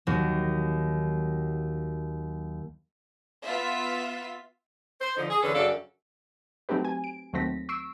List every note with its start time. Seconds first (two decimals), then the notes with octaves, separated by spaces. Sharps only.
0.07 D#2 F#3
3.45 B3 F4 E5 B6
5.01 C5
5.17 D3 F3 D#4
5.30 G#4
5.42 E2 D3 C#4 A4 B4
5.55 F#2 C#3 D4 A4 D5 F5
6.69 F#3 A3 C4 D#4 G4 B4
6.85 G#5
7.04 D7
7.33 D#2 F#3 A3 C4 A#6 B6
7.69 C#6 E6 C7 D7